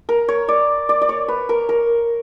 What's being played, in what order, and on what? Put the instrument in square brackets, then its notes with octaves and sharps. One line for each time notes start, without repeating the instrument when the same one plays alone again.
[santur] A#4
C#5
D5
D5
D5
C#5
B4
A#4
A#4